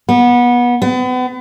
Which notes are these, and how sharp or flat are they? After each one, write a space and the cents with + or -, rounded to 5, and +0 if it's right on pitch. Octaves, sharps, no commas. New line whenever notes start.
B3 -25
B3 +35